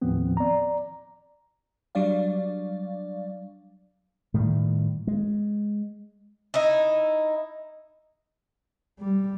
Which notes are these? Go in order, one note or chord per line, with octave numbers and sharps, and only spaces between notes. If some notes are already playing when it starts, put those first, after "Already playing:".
D#2 A2 F3 B3 C4
D5 A#5
F#3 G3 D4 D5 F5
A2 D#3 G3
G#3
D#4 E4
G3